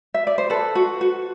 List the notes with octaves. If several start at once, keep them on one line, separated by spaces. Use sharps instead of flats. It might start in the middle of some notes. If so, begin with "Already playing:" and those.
E5
D5
C5
A4 B4
F#4
F#4